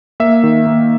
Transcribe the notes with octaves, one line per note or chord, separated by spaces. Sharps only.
A#3 E5
D#3
A#3